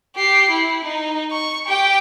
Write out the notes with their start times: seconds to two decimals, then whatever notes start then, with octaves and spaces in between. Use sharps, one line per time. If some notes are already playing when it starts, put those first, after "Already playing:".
0.16 G4 C7
0.50 E4
0.84 D#4
1.32 C#6
1.67 G4 G5